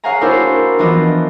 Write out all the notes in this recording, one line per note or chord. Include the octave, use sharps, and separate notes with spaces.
G#4 C#5 F5 F#5 G#5 A#5
A#3 D4 E4 F#4 A#4 C5
E3 F3 B3 D4 F4 D#5